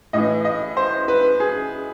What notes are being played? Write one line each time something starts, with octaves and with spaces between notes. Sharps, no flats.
A2 E3 D#5
D#5
C5
B4
G#4